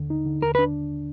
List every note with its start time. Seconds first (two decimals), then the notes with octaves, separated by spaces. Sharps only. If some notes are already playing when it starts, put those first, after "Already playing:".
Already playing: D#2 D3
0.10 D#4
0.25 D3
0.42 D#2 A#4
0.55 B4
0.59 D4